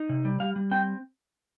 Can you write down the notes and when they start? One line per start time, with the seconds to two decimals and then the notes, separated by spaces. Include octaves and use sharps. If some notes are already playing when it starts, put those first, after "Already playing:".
Already playing: D#4
0.09 C3
0.25 G3
0.40 G3 F5
0.56 G3
0.71 C4 G5